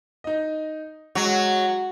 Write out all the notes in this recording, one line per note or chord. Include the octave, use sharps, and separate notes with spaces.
D#4 D#5
F#3 G#3